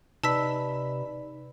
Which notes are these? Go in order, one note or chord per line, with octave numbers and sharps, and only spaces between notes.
C3 D#4 B4 D5 A5 B5 E6 B6